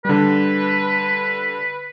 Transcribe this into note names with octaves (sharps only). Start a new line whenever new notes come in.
D3 G3 B4